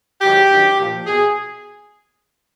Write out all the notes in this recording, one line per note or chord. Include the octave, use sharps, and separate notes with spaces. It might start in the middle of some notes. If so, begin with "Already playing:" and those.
G#2 D#3 F#3 G4
G2 D#3 F#3
A#2 F3
B2 G#4